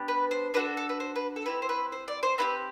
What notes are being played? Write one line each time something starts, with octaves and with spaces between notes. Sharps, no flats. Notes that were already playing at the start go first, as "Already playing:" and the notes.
Already playing: B3 D4 G4
B4
C5
D4 F#4 A4 B4
A4
B4
C5
B4
A4
C4 E4 G4 B4
C5
B4
C5
D5
C5
C4 E4 G4 B4